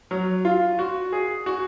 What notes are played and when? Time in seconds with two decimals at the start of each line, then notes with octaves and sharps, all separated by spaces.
0.11 F#3
0.45 F4
0.79 F#4
1.13 G#4
1.46 F#4